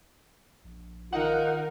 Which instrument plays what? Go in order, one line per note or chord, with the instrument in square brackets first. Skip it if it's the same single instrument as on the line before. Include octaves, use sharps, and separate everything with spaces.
[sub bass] A#1
[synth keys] D#3 F#5 [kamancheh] D#4 A#4 [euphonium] F4